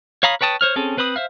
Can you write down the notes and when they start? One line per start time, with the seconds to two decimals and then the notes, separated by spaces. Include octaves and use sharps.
0.23 C#5 F5 A#5 B5 D#6
0.41 B4 C#5 G5 A5 D#6
0.61 C5 C#5 F6
0.76 C4 C#4 G#4 A4
0.97 C4 B4 C5 B5 D#6
1.16 C5 E5 F5